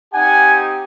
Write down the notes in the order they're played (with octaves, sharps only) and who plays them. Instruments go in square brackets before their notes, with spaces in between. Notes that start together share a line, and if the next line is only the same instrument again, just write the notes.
[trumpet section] C4 D#4 G4 F#5 G#5